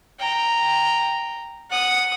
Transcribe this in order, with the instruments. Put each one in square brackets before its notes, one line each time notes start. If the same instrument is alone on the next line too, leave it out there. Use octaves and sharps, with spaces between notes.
[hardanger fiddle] G5 A#5
F#5 D#6